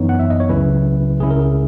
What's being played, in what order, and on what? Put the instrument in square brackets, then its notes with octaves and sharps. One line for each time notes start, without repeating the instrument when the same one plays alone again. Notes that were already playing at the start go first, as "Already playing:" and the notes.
Already playing: [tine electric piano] F#2 E3 B3 D#4 C#5
F#5
E5
D#5
C#5
C#2 C#3 F#3 C#4 E4 B4
C#2 C#3 G#3 C#4 E4 G#4
A#4
G#4